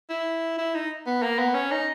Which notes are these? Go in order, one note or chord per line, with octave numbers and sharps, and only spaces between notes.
E4
E4
D#4
B3
A#3
B3
C#4
D#4